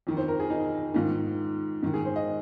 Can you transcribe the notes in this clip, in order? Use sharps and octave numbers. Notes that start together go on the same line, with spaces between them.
F2 D#3
C5
A#4
G#4
D#4
G#2 D#3 F4
G#2 D#3
G#4
C5
D#5